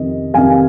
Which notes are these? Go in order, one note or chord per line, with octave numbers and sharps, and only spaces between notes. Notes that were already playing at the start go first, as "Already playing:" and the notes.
Already playing: F2 C3 D#3 D#5
F2 C3 D#3 F5 G#5